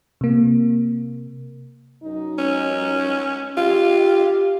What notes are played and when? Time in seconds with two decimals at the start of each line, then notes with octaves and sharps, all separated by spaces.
0.21 C3 A#3
2.04 F#2 D#4
2.38 C#4
3.57 F4 G4